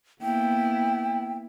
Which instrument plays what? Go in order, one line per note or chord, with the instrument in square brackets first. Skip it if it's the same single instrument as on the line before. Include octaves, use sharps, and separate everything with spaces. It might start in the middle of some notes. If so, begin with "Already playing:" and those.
[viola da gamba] A#3 B3 E4 [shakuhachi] G5